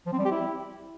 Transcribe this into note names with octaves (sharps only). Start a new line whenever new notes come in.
F3
C4
G3
G4
E4